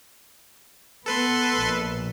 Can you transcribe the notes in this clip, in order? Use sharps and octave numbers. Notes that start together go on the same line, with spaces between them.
B3 A4 B4 C6
A#1